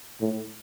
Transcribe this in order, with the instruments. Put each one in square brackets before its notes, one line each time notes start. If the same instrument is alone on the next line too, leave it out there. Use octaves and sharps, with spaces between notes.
[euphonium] A2